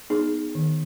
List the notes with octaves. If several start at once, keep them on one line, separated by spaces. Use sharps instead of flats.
B3 D#4 G#4
B3
D#3